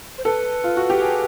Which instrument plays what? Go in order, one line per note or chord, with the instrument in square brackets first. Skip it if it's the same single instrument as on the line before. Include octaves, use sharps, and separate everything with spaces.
[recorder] C5
[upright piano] A4 [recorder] B4
[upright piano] F4
F#4
G4
G#4